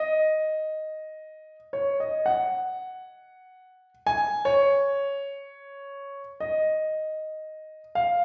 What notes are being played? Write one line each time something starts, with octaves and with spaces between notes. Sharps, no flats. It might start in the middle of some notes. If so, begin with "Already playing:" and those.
Already playing: D#5
C#5
D#5
F#5
G#5
C#5
D#5
F5